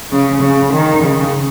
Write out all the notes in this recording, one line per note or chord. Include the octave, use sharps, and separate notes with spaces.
C#3
C#3
D#3
C#3